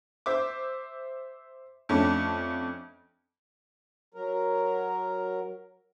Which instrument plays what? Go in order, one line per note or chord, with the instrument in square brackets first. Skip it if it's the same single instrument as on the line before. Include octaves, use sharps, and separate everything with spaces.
[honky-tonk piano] C5 E5 D6
F2 A3 C#4 D4
[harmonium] F#3 A#4